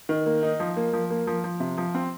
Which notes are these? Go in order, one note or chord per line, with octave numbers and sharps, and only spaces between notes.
D#3
A#3
D#4
F3
A#3
F3
A#3
F3
F3
C3
F3
C4